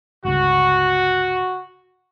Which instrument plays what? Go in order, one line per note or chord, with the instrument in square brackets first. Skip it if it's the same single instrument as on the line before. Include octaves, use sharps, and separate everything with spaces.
[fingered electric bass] G1 C#2 [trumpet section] F#4